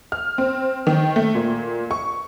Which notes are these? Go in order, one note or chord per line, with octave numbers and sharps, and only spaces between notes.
F6
C4
D#3
A3
A#2
C#6